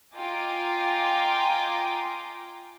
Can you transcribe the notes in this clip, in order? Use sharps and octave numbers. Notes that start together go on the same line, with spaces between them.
F4 D#5 G5 G#5 A#5 D6